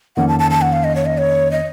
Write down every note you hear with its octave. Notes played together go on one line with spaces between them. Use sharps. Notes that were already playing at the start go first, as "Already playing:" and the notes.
F2 D#3 A#3 C#4 F#5
A5
A5
A5
F#5
F5
D#5
C#5
D#5
C#5
D#5